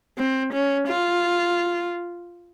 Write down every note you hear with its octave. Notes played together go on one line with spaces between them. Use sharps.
C4
C#4
F4